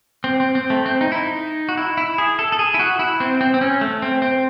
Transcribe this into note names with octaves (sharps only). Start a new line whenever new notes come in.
C4
C4
C4
A3
C4
D#4
E4
D#4
F#4
E4
E4
G#4
A4
A4
G#4
E4
F#4
E4
C4
C4
C4
C#4
A3
C4
C4